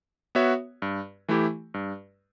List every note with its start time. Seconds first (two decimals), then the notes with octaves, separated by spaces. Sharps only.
0.35 B3 F#4 C#5 E5
0.82 G2
1.28 E3 A3 E4 G4
1.74 G2